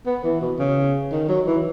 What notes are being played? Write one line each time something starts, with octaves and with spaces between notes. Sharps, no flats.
B3
E3
B2
C#3
D#3
F#3
E3